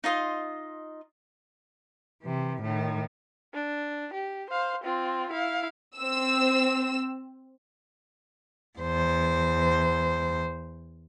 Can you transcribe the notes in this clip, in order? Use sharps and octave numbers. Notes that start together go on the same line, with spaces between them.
D#4 F4 D#5 C6
C3 E3
A2 D#3
D4
G4
C5 F5
C4 F4
E4 F5
C4 E6
E2 C5